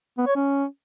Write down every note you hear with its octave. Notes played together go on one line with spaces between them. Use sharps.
B3
C#5
C#4